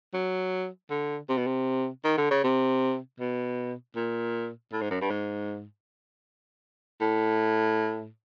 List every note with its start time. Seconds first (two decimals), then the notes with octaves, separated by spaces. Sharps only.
0.14 F#3
0.91 D3
1.29 C3
1.38 B2
1.47 C3
2.05 D#3
2.18 D3
2.31 C#3
2.44 C3
3.20 B2
3.96 A#2
4.73 A2
4.82 G#2
4.91 F#2
5.01 G2
5.11 G#2
7.01 A2